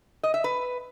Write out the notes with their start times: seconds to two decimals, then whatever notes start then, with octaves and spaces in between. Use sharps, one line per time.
0.23 D#5
0.34 E5
0.44 B4